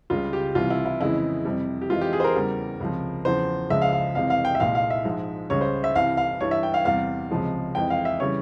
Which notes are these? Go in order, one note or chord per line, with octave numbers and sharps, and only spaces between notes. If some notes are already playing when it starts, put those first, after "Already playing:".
C#2 C#3 G3 F4
G4
C2 C3 E3 G3 F4
E4
E4
F2 C#3 E3 G#3 E4
F2 C3 G3
G4
F2 E3 G#3 F4
G4
G#4
C5
A#4
E2 C#3 G3
C#2 C3 F3
E2 C#3 F3 C5
C#2 C#3 F3 G#3 E5
F5
F5
F2 C3 E3 G#3 F5
F5
G5
E5
C2 A#2 G#3 F5
F5
E5
G#2 F3 G#3
C#2 C#3 G3 C#5
C5
E5
C2 C3 E3 F5
F5
G2 E3 G3 C#5
E5
G5
F5
E2 C3 G3 F5
C#2 C3 F3 G#3
F2 E3 G#3 G5
F5
E5
C#3 E3 G3 C#5